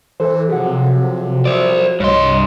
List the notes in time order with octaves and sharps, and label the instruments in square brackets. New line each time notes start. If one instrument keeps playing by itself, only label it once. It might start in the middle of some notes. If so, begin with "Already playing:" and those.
[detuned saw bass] E3 [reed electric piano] A4 C5
[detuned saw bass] C3 [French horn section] F3 F#3 F#4 [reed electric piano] G#4 A4 F#5
[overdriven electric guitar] C5 D5
[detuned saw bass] C2 [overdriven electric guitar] G2 C6 [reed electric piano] C#5 D#5